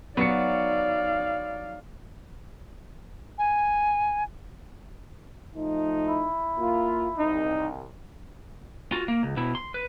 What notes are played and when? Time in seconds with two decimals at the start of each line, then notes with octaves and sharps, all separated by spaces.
0.17 F#3 B3 D#4 D5 F5 C#7
3.38 G#5
5.55 F3 A3 D#4
6.08 E4
6.59 A#3 F4
7.18 C2 D#4
8.92 F4 F#4
9.08 A#3
9.23 C#2
9.37 B2 E4
9.55 C6
9.74 B4